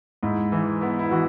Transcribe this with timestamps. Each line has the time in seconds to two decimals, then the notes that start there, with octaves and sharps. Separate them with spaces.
0.23 G#2 E4
0.52 E3
0.81 B3 E4
0.99 E4
1.11 E3 F#4